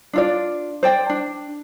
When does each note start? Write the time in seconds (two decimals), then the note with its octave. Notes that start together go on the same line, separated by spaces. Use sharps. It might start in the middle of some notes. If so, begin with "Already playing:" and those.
0.13 D4 F4 D5
0.83 C5 D5 G5
1.10 D4